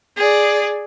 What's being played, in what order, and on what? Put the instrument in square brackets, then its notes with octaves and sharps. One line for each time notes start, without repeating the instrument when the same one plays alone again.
[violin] G#4 D5